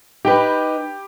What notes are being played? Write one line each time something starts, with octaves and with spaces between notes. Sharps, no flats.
D#4 G4 B4 G5 B5